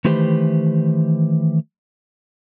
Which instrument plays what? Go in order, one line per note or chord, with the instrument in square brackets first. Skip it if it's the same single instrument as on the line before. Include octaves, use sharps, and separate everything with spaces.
[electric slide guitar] D#3 E3 A3 G4 B4 C5